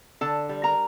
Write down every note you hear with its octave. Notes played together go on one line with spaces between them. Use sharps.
D3 A4 A5
G3
A#4 A#5